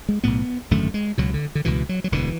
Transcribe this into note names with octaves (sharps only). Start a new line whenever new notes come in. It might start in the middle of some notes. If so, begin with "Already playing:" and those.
G#3
B1 A2 B3
G#1 F#2 D3 A3
G#3
C#2 B2 F#3
D3
D3
C#2 B2 E3
F#3
F#3
E1 D2 D3 E3